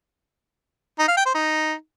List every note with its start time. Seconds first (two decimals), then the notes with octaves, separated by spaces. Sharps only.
0.99 D#4
1.08 F5
1.17 G5
1.26 C5
1.35 D#4